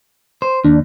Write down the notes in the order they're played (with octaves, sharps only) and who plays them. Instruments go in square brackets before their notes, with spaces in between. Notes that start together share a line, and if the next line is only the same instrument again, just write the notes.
[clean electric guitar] C5
[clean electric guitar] D#2 [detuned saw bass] D4